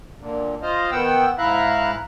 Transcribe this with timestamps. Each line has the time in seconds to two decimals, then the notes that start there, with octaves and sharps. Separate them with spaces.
0.20 A#2 D3
0.62 F4 C5 D#5 F5
0.92 D#3 B3 F#5 G5 E6
1.38 G#2 E4 E5 F5 A#5 F#6